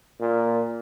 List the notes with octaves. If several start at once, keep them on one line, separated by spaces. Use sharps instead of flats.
A#2